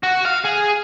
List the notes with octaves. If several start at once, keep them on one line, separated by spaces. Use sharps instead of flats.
F#4
F5
G#4